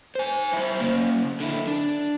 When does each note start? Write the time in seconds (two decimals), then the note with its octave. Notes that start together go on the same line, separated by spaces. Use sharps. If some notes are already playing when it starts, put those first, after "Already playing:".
0.15 C5 G#5
0.53 E4 C5
0.80 C#3 A#3
1.40 D3 E4
1.67 D4